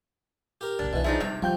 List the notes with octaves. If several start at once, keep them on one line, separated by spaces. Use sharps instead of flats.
G4 A#4
F#1 B1 D4
B1 B2 E3
F3 D4 D#4 G#4 E5
G2 C3 G3 G5
F3 G3 C4 G5 G6